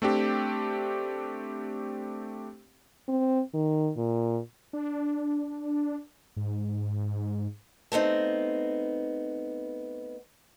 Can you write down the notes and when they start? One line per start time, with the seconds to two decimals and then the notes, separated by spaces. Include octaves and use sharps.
0.02 A3 C4 D4 G4
3.08 C4
3.54 D#3
3.97 A#2
4.73 D4
6.36 G#2
7.92 A3 B3 C4 D#4